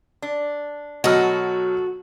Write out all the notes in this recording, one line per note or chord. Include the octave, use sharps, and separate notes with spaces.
D4
B2 F#3 F#4 A4 D#5 F6